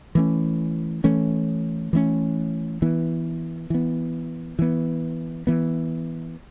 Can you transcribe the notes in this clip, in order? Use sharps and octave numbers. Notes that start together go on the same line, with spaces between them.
E3 A3 C#4
E3 A3 C#4
E3 A3 C#4
E3 B3
E3 B3
E3 B3
E3 B3